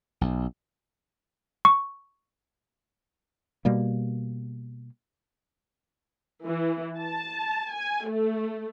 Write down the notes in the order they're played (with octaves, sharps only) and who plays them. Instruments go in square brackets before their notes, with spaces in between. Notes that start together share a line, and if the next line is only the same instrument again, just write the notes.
[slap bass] B1
[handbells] C#6
[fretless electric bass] B2 G3 A#3
[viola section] E3
A5
G#5
A3